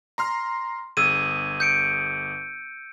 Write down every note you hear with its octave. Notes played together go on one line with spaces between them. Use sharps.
A#5 C6 F6
G1 G#4 E6 G#6 D#7
G6 C#7 D7